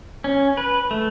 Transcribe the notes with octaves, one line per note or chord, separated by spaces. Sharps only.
C#4
B4
A3